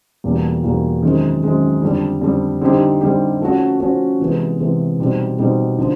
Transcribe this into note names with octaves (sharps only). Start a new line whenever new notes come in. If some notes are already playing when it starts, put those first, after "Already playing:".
E2 B2 G3 A#3
E2 B2 G3 A#3
F#2 D#3 G#3 C4
F#2 D#3 G#3 C4
F2 D3 G3
F2 D3 G3
D3 G3 C4 D#4 G4
D3 G3 C4 D#4 G4
F3 A3 C#4 F#4
F3 A3 C#4 F#4
C3 E3 G#3 B3
C3 E3 G#3 B3
B2 G3 C4 D#4
B2 G3 C4 D#4
D3 F3